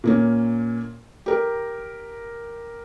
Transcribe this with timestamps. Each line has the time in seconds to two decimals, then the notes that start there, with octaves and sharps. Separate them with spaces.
0.04 A#2 A#3 C#4
1.26 G4 A#4